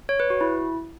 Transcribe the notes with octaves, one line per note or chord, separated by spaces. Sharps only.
C#5
B4
F#4
E4